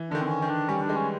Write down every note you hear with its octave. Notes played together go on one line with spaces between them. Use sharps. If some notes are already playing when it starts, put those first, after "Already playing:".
Already playing: E3
D3 D4
D#3
C4
C#4
D#3
D4
G3 C#4
D4
G#3
C#4